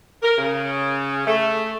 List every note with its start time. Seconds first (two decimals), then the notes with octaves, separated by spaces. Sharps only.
0.23 A#4
0.38 C#3
1.27 A3